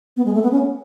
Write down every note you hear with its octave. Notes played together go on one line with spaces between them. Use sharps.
B3
G#3
A3
B3
C#4